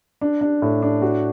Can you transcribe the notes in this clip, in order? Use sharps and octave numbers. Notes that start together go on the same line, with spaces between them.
D4
D4
A2
D4
F#4